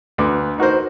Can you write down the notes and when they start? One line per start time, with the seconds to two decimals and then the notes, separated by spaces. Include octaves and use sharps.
0.18 D2 B4 D6
0.58 D#4 F#4 A#4 C5